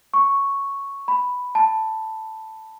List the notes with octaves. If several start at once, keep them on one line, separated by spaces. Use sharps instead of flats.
C#6
B5
A5